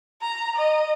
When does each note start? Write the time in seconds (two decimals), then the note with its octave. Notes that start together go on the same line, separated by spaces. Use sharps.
0.22 A#5
0.56 D#5